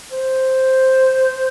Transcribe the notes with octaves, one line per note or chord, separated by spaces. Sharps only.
C5